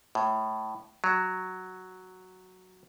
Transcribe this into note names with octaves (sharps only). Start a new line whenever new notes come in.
A2
F#3